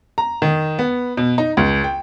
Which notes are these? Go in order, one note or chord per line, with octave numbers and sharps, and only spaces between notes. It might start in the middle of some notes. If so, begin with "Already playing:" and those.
A#5
D#3
B3
B2
D#4
C#2
G5